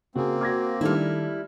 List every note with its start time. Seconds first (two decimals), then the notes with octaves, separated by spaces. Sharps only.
0.16 C#3 A#3 C4 F#4 G#4
0.41 F#4 F5 D6 G#6 A#6
0.81 D#3 G3 A3 D4 E4 A4 F6